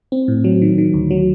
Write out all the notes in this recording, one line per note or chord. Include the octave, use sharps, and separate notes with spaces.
C4
A2
F#3
D#3
D#3
D2
F#3